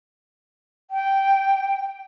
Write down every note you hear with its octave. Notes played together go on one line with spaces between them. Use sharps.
G5